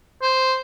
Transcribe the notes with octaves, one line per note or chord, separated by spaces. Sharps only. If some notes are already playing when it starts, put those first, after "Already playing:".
C5